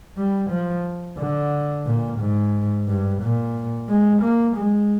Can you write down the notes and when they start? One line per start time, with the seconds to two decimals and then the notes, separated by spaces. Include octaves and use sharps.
0.17 G3
0.51 F3
1.18 D3
1.86 A#2
2.20 G#2
2.88 G2
3.22 A#2
3.89 G#3
4.23 A#3
4.57 G#3